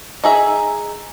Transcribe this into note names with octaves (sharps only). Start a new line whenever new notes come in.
D#4 G#4 E5